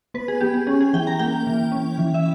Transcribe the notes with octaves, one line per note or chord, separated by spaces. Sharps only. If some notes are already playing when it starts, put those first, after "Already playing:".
B3 B4
G#4
B3 G4
G#4
C#4 G#4
G#4
E3 G5
A#5
A#3 G5
E3
C#4
E3
E5